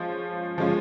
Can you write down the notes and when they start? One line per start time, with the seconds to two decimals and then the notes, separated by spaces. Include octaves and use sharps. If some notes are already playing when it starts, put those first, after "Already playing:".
Already playing: F3 G#3 C#4 F4
0.58 F3 G#3 C#4 F4